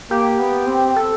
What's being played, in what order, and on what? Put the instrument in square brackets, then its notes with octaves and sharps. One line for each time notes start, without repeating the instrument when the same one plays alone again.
[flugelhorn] A#3 [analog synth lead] G4
[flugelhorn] B3
C4
[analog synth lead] A4